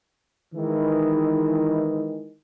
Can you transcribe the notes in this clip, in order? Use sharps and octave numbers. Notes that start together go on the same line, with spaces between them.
D#3 E3 G#3